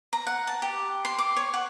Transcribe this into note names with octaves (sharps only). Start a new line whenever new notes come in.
A#5
F#5
A5
G4
C6
D6
C#5
F#5